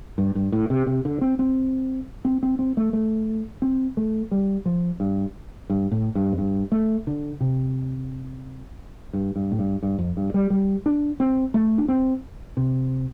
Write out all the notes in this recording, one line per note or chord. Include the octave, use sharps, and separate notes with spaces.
G2
G2
A2
C3
C3
D3
C4
C4
C4
C4
C4
A3
A3
C4
A3
G3
F3
G2
G2
A2
G2
F2
G2
A3
D3
C3
G2
G2
A2
G2
G2
F2
G2
G3
G3
D4
C4
A3
D4
C4
C3